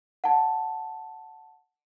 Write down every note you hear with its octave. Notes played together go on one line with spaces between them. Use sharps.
F#5 A5